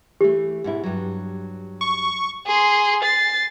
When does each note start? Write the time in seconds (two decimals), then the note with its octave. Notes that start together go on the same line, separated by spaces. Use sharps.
0.21 E3 A3 G4
0.64 G#2 B2 E4
0.84 G2 F#3
1.81 C#6
2.47 G#4 C6
3.03 A6 C7